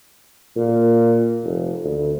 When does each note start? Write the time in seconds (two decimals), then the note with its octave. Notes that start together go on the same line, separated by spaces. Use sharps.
0.56 A#2
1.44 F1
1.84 D2